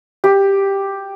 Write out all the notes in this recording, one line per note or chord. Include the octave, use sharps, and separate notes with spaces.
G4